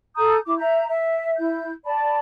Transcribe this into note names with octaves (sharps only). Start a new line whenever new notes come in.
A4 A#5 D#6 G6
E4 D6
E5 A#5 G6
E5
E4 G6
D5 A5 B5